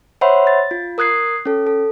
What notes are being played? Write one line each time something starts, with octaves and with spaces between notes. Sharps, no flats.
C5 C#5 E5 F#5 B5 C6
A6
F4
A#4 D#6 F#6 G#6 C7
C#4 A4
A4